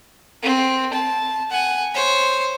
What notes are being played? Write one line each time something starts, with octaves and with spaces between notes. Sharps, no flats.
C4
A5
F#5 G#5
C5 C#5